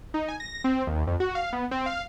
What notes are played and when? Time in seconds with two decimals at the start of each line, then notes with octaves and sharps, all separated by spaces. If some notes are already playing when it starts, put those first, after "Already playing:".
0.14 D#4
0.28 G#5
0.40 A#6
0.64 C4
0.87 D#2
1.07 F2
1.20 F#4
1.35 F5
1.53 B3
1.71 C4
1.86 F5